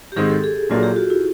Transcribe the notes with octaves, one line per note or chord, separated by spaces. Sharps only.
G4
G#2 D#3 G#3 C4 G#4
A4
G#4
A#1 A#2 F#3 A#3 D4 F4
G4
F#4
E4